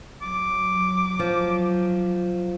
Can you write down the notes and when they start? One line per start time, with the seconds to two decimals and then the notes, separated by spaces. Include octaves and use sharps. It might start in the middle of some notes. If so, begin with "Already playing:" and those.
0.22 F#3 D6
1.19 F3